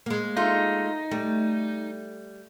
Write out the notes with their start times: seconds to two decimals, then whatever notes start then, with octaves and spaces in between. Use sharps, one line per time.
0.06 G#3 A#3
0.36 A3 D#4 F4
1.11 G3 A3